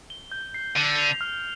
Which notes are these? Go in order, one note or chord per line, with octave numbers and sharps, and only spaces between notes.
G7
G6
C7
D3 C7
F7
F6